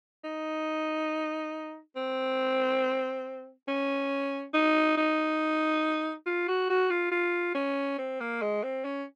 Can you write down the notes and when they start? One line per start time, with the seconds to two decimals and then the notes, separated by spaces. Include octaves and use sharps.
0.24 D#4
1.96 C4
3.68 C#4
4.54 D#4
4.97 D#4
6.26 F4
6.48 F#4
6.70 F#4
6.90 F4
7.12 F4
7.55 C#4
7.98 C4
8.20 A#3
8.42 G#3
8.63 C4
8.85 C#4